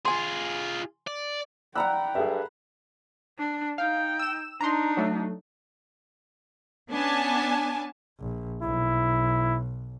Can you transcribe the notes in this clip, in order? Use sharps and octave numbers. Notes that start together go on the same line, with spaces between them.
F4 G#4 G#5 C6
D5
D5 F#5 G5 A#5 B5 E6 F#6
G2 G#4 A4 E5
D4
D#4 F5 G5
E6 E7
D4 D#4 A#5 C6
F#3 A3
B3 C#4 D4 G#5 A5
A#1
B1 E4